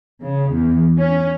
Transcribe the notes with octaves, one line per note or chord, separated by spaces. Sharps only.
C#3
E2
C#4